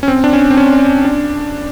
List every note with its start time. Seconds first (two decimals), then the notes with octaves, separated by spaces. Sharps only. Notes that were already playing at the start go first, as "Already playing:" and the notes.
0.03 C#4
0.08 C4
0.24 D4
0.33 C#4
0.50 C4
0.57 C#4
1.05 D4